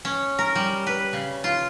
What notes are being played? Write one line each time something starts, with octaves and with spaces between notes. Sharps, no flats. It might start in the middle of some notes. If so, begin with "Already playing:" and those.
C#4
A#4
G3
B4
C#3
F4